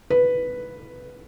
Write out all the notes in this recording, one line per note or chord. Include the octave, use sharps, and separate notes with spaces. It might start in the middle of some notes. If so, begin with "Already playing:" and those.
B4